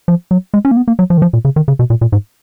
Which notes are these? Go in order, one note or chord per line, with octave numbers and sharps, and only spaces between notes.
F3
F#3
G#3
C#4
A#3
B3
A#3
F#3
F3
D#3
F3
A#2
C#3
D#3
C#3
B2
A#2
A#2
G#2